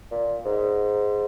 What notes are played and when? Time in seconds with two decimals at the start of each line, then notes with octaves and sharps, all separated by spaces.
0.11 A#2
0.45 G#2